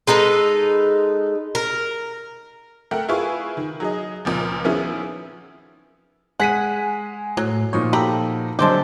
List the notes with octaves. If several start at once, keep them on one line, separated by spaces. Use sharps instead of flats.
G#3 D#4 A4 B4
A#4
A3 A#4 F#5 G5
E4 F4 G#4 B4 G#5 C#6
D#3
F#3 G#4 D#5
C#2 A#2 F3
D#3 F3 B3 C#4 E4 G#4
G#3 F#5 G#5 B6 D#7
A2 F#3
A#2 F3 D#4 C#5
F#4 G4 A4 A#5 B5
D3 F#3 G#3 C4 D4 G4 A5